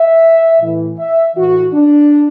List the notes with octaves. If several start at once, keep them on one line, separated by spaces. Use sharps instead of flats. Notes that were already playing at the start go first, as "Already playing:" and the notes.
Already playing: E5
A2 E3
E5
A2 E3 F#4
D4